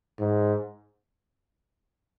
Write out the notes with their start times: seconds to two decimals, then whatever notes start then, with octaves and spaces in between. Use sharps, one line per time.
0.20 G#2